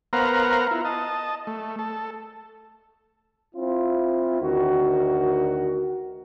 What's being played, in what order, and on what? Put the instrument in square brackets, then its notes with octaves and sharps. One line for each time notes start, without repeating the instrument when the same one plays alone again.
[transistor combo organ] B3 A#4 C5 F5 F#5 A#5
E4 F4
D#5 A5
A3
A4
[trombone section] C4 E4 F4
D2 D#3 F#4